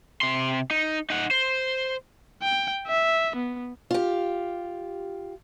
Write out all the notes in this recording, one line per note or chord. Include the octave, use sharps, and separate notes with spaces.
C3 C6
D#4
D#4 F#5
C5
G5
E5
B3
F4 G4